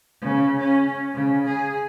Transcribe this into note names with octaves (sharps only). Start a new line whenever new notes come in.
C#3
C#4
C#3
G#4